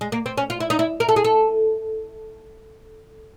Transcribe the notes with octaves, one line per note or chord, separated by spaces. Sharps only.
G#3
A#3
C4
C#4
F4
E4
D#4
E4
A#4
A4
G#4
A4